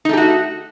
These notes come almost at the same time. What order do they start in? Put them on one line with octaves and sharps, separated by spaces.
D#4 A3 G4 F#4